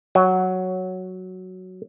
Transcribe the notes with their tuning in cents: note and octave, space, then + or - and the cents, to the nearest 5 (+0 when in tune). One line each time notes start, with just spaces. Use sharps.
F#3 +0